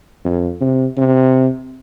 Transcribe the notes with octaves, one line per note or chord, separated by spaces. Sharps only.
F2
C3
C3